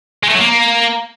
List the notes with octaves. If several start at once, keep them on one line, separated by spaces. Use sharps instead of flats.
G#3
A3
F#3
A#3